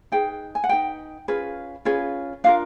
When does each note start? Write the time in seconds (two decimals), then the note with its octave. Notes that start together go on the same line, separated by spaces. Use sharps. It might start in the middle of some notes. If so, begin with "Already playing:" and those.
0.12 D#4 G#4 B4 G5
0.55 G#5
0.64 F#5
0.69 D#4 G#4 B4 G5
1.28 C#4 F4 G#4 B4
1.85 C#4 F4 G#4 B4
2.44 D4 F4 A#4 F5